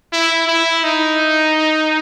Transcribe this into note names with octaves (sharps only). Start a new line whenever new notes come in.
E4
E4
D#4